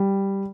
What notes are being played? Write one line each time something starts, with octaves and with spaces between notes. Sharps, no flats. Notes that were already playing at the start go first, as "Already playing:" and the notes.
Already playing: G3